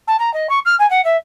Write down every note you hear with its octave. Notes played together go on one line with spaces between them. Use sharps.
A5
A#5
D#5
C#6
F6
G#5
F#5
E5